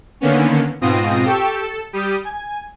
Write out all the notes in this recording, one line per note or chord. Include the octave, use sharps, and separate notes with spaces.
D3 D#3 A#3 B3 C#4
G#2 B2 C4 F4 D#6 A#6
G4 A4 G5 C#6 E6
A4
G3 G4 D#6 D#7
G#5